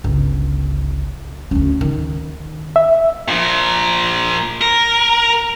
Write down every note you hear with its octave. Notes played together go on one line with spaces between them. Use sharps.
G1 C#2
D2 C#4
D#3
E5
A#2 F3
A#4